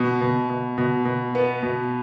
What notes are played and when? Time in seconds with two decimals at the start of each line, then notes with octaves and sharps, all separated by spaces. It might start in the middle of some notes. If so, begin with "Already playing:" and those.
Already playing: B2
0.21 B2
0.50 B2
0.78 B2
1.05 B2
1.35 B3
1.63 B2